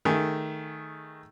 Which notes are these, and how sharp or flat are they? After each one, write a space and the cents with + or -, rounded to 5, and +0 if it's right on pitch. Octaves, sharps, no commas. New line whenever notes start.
D#3 +0 A3 +0 G#4 +5